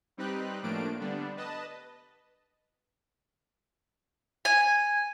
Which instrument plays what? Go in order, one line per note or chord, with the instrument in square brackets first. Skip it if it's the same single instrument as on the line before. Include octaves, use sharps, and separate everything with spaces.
[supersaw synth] G3 C4 D#4 G4 B4 F#6
A2 F3 A3 A#3 D4 D7
D3 G3 B3 D4
B4 D#5 A5
[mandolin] G#5